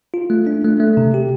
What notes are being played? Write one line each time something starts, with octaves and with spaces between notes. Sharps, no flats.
F4
A3
D4
A3
A3
C3
G4